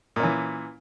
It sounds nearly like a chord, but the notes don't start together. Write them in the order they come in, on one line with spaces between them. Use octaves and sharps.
A#2 C#4 E3